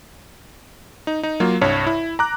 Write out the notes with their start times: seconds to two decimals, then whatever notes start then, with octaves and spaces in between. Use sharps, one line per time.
1.07 D#4
1.23 D#4
1.40 F#3 A#3 F4
1.61 C2 G2 C#5
1.87 E4
2.19 A#5 D6 F#6